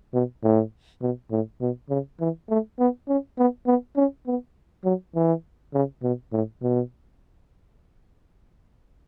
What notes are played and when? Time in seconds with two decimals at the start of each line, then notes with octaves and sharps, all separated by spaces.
0.14 B2
0.43 A2
1.02 B2
1.31 A2
1.61 B2
1.90 C#3
2.20 E3
2.49 A3
2.79 B3
3.08 C#4
3.38 B3
3.67 B3
3.96 C#4
4.27 B3
4.85 F#3
5.15 E3
5.74 C#3
6.03 B2
6.32 A2
6.62 B2